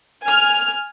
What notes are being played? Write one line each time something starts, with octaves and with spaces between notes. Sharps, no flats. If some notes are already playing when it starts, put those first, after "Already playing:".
G#5 F6